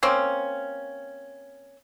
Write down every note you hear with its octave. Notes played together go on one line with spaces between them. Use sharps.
A#3 C4 C#4